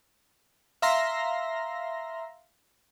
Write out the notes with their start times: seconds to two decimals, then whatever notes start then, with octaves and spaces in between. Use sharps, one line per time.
0.82 E5 F5 A#5 C6 A#6